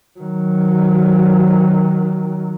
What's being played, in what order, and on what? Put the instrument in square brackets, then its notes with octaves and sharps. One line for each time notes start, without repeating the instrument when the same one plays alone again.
[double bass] D#3 F#3